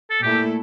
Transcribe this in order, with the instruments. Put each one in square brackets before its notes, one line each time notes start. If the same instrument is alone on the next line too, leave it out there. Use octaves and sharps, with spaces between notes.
[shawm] A4
[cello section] A#2 A3 E4 A4 [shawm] G4